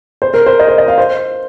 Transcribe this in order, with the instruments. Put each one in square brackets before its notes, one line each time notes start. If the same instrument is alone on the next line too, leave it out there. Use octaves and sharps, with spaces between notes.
[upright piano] C5
A#4
C5
D#5
C5
D#5
F5
C5